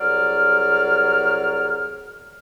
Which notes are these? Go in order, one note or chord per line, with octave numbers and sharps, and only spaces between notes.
C2 F#3 G#4 D5 F6